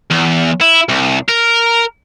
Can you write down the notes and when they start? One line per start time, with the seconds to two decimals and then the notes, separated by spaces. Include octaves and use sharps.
0.10 E2
0.61 E4
0.89 C2
1.29 A#4